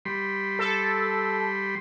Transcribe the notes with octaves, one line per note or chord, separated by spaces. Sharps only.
G3 B5 C6
A4